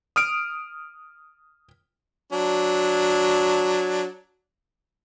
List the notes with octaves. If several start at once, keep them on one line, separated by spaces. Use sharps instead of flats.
D#6 F6 D7
F#3 D4